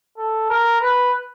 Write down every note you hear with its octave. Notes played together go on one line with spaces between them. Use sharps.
A4
A#4
B4